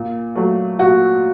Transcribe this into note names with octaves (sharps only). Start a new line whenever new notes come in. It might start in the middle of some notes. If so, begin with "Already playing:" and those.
Already playing: A#2
F#3 A3
A#2 F#4